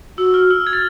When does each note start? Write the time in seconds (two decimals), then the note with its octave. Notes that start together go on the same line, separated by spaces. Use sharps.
0.18 F#4 E6
0.34 F6
0.51 E6
0.67 G#6
0.73 A6